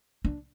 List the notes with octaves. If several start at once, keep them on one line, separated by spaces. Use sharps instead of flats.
D4